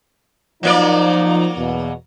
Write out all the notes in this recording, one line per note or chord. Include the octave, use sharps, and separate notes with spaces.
F3 F#3 A#3 D#4 D5
E2 B2